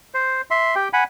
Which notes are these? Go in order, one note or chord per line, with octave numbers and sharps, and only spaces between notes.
C5
E5 C6
G4 G5
F#5 G#5 B5